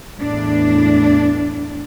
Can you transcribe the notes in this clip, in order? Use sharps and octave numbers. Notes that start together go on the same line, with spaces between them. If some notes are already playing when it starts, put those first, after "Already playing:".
E2 A2 D4